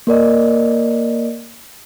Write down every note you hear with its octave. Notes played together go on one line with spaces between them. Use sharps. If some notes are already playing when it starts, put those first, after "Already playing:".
A#3 A#4 D5 D#5